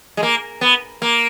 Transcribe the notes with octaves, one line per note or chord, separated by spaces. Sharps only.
G#3
A#3
B3
A#3